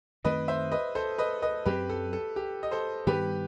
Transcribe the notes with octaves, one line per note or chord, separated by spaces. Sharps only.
F#2 D#3 A3 C4 B4 D#5
C5 E5
B4 D#5
A4 C5
B4 D#5
B4 D#5
F#2 F#3 A3 C4 G4 B4
A4
A4
G4
D#5
A4 C5
G2 D#3 G3 B3 G4 B4